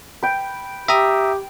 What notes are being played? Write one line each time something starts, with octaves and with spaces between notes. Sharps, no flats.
B4 G5
G4 E5 G5 A#5 D#6